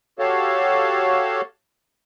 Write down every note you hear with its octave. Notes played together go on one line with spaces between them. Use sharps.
F#4 G4 A4 C#5 F5 A5